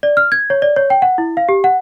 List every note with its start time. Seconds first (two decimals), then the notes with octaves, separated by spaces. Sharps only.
0.03 D5
0.17 F6
0.32 G#6
0.50 C#5
0.62 D5
0.76 C#5
0.90 G5
1.02 F#5
1.18 E4
1.37 F5
1.49 G4
1.64 F#5